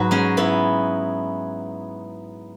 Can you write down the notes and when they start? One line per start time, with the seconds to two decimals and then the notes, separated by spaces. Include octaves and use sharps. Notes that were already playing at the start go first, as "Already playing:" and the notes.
Already playing: G#2 F#3 F#4 B4
0.11 G#3 C#4
0.37 B3 E4